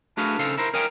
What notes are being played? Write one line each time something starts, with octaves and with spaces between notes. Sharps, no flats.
A3 D4 F#4 G#4 B4 F5
C#3 D#4 A4 C5 F5
E4 A#4 C5
A#4 C#5 D#5 F5 G5 G#5